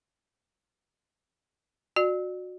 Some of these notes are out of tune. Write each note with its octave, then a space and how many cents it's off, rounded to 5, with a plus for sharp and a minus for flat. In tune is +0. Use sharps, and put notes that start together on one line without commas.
F#4 -20 D5 +35